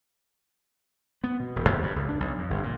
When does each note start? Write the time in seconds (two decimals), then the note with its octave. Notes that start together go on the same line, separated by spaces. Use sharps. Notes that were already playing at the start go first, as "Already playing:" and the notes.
1.24 B3
1.40 B2
1.56 E1
1.69 D#2
1.82 G2
1.96 C#2
2.09 D4
2.20 B1
2.38 F2
2.50 G1
2.63 A#2